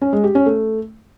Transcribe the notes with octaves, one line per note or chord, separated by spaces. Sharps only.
C#4
G#3
G4
C#4
A3